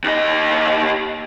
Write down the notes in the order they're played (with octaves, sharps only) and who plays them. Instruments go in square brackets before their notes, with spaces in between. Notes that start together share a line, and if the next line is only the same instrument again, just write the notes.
[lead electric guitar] D#2 D#5